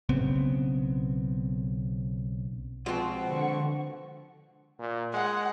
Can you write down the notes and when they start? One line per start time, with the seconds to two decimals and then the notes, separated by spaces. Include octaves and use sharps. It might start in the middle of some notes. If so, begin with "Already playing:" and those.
0.09 B1 C#3 B3 C4
2.86 B2 F3 G#3 C4 F4 F#5
3.27 D3 C#6
4.79 A#2
5.14 G#3 F#5